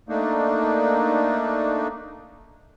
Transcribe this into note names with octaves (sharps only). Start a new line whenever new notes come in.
A3 A#3 D4 D#4